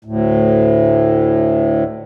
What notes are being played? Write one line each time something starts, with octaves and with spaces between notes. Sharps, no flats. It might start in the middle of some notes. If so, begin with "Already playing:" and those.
D2 A2